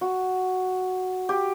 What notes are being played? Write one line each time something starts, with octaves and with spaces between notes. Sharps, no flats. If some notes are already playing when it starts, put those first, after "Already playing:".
F#4
G4